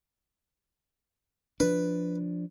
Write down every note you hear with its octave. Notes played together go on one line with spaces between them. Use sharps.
F3 D4 B4